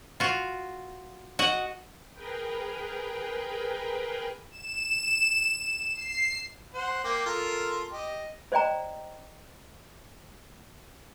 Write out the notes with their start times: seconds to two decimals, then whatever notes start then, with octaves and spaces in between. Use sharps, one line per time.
0.20 F4 F#4
1.39 F#4 D#5 F#5
2.13 G#4 A#4 B4 G5
4.51 E7
5.94 C7
6.74 C5 F#5 C6
7.04 A#3 G5 D6
7.26 F4 A4 A#4
7.92 G4 D#5
8.52 C5 D5 D#5 G5 A#5